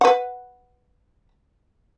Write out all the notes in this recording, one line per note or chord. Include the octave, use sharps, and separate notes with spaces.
B4 F#5